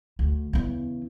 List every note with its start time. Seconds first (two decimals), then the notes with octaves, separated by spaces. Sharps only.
0.19 D2
0.53 E2 C#3